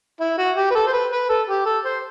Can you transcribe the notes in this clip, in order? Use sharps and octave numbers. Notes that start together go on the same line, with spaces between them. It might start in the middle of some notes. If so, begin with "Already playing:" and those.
E4
F#4
G4
B4
A4
C5
B4
B4
A4
G4
A4
C5